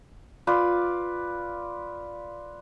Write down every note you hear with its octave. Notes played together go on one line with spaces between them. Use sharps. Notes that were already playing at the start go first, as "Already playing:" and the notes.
F4 B4 D5